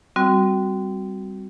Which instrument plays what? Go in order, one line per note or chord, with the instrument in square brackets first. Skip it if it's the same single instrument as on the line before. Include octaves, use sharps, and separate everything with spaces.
[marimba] G3 C4 F#4